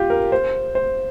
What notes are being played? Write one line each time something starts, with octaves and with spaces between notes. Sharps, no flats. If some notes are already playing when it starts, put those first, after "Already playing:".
Already playing: F4 G4
A#4
C5
C5